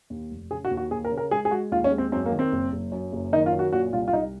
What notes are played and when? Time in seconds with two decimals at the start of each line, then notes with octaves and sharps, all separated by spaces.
0.10 D#2
0.30 F1
0.51 C#3 G#4
0.65 F#4
0.71 D#2
0.77 F#4
0.91 D#2 G#4
1.05 A#4
1.11 C#3
1.17 A#4
1.31 G#3 G#4
1.45 G#4
1.51 G#3 F#4
1.71 D#2 F4
1.84 C#4
1.92 G#3
1.98 C4
2.12 F#2 C4
2.26 A#3
2.32 D#3
2.39 C4
2.52 F#1
2.72 F#1
2.92 F#2
3.13 F#1
3.32 D#3 D#4
3.46 F4
3.52 F#2
3.59 F#4
3.72 A#2 F#4
3.93 C2 F4
4.08 F4
4.13 C2 D#4